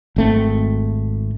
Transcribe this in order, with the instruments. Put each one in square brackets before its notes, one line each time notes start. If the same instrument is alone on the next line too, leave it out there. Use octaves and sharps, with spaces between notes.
[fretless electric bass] G#1 A3 C4